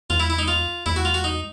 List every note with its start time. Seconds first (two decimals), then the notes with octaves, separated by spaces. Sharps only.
0.10 E2 F4
0.20 E4
0.30 E4
0.38 D#4
0.48 F4
0.86 E2 E4
0.96 F#4
1.05 F4
1.14 F#4
1.24 D#4